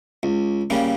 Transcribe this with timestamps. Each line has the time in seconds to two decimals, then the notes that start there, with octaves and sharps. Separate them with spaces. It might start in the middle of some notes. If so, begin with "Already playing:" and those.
0.23 C#2
0.70 C#3 G3 A#3